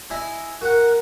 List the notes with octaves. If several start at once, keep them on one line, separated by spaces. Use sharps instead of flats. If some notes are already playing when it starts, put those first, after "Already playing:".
E4 D#5 G#5
F#4 A#4 F#5